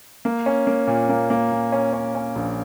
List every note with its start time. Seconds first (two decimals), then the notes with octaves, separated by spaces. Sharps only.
0.25 A#3
0.46 C#4
0.67 A#3
0.87 A#2
1.09 A#3
1.30 A#3
1.52 A#2
1.72 C#4
1.93 C#4
2.15 C#4
2.36 A#1